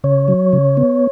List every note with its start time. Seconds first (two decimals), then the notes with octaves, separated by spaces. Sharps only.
0.04 C#3 C#5
0.28 F#3
0.53 C#3
0.77 B3